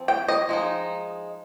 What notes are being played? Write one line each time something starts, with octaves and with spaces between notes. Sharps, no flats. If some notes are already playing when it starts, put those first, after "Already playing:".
Already playing: F3 C4
G5
D#5
F3 G#3 D#4